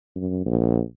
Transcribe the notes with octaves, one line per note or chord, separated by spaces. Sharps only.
F#2
A#1